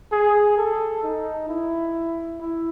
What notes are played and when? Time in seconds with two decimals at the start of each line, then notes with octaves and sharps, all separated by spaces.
0.12 G#4
0.58 A4
1.03 D#4
1.49 E4
2.40 E4